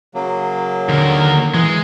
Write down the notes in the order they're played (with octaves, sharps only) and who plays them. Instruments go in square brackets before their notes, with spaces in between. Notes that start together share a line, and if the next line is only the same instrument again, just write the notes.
[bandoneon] C#3 F#3 A#3
[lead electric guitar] D#2 A#4 [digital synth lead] D3
[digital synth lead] E3 [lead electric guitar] G#3